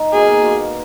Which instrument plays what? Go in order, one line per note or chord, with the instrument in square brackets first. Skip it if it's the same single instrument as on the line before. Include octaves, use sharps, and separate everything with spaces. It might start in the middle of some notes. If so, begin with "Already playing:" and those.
Already playing: [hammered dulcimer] D#4
[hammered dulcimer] B2 A#3 F4 [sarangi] G#4
[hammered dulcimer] B2 A#3 F4